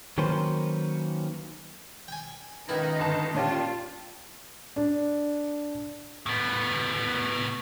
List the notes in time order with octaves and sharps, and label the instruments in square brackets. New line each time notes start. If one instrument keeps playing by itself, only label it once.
[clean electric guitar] D#3 F#3 A#3 C#4 B4 C5
[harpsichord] G5 G#5
[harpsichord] C#2 D#3 E4 [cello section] D#4 [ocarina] B4
[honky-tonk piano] G1 A5
[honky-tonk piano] A#2 C#4 G4 [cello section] F4 [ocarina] A5
[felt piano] D4
[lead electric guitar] A2 B3